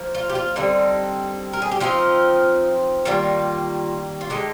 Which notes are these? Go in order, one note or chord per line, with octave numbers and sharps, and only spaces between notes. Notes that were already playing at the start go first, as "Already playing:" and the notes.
Already playing: F3 A#3
F4
G4
F4
D3 G3 C4 D#4
A#4
G#4
G4
F3 C4 D#4 F4
D#3 G3 A#3 F4
F4
D3 G#3 D#4 G4